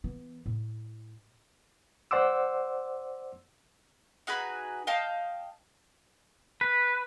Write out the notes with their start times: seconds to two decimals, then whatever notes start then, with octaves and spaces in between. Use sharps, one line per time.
0.04 E3 B3
0.46 A2
2.11 C5 D5 F#5 C6 D6 E6
4.27 D#4 F#4 G#4 B4
4.87 D#5 F5 G5 A5
6.61 B4